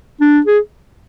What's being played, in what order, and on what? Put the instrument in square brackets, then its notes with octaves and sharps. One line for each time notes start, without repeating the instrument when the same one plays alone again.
[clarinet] D4
G#4